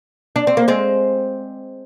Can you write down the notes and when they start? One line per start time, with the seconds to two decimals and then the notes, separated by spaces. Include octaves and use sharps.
0.36 D4
0.47 C4
0.57 A#3
0.68 G#3 C4